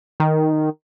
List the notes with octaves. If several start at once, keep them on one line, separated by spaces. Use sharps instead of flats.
D#3